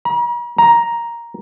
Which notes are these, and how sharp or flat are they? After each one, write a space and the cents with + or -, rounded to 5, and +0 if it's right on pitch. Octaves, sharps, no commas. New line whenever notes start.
A#5 +45
A#5 +5